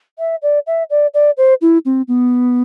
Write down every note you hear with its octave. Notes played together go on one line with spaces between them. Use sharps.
E5
D5
E5
D5
D5
C5
E4
C4
B3